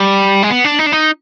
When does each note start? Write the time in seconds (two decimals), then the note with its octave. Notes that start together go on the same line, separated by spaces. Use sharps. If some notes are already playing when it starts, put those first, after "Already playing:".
Already playing: G3
0.43 G#3
0.50 B3
0.64 D4
0.79 D#4
0.87 D4
0.93 D#4